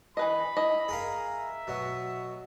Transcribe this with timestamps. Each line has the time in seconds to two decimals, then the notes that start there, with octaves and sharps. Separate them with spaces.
0.17 E3 B4 D#5 B5
0.57 E4 D#5
0.88 G#4 A#4 F5
1.28 E5
1.67 B2 F#3